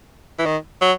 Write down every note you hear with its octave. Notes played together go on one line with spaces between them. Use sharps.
E3
D#3
F#3